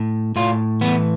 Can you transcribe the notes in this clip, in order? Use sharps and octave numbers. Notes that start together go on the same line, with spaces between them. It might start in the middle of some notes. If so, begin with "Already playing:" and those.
Already playing: A2
A2 F4
E3 B3